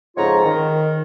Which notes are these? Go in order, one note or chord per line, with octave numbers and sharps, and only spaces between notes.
F2 G#2 C#3 F4 C#5 A#5
D#3